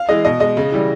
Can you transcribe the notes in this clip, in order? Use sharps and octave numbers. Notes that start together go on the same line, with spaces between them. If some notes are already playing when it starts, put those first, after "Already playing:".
Already playing: F5
E3 G#3 D#5
B2 D#5
G#3 D#5
C#3
E3 G3